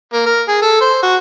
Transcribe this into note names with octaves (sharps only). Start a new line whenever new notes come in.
A#3
A#4
G#4
A4
C5
F#4